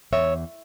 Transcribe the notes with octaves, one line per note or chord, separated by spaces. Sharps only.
E2 C#5 E5